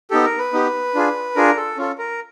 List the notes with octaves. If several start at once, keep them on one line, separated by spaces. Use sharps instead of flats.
B3 D#4 G4 A4
A#4
B4
B3 D#4 G4
D4 F4 G#4
D4 F4 G#4 A#4
A4
C#4 F4 A4
A#4